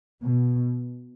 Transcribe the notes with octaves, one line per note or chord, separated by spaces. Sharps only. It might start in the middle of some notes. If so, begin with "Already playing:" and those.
B2